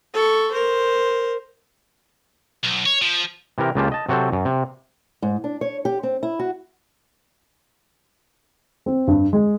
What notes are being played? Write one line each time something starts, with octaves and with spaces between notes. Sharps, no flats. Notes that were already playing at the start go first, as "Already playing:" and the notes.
A4 C#6
A#4 C5
B1
C#5
F3
C3 E3 G4 A#4
C#2 C#3 A#3 F4 G4 A5
D#5 A5
C3 F#3 F#4 A4 C5
F#2
C3
G#2
D4
C#5
G4
C4
E4
F#4
C4
G2
G#3